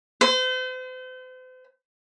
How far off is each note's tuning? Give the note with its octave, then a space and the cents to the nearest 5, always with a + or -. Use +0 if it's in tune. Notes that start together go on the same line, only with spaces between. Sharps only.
C5 -40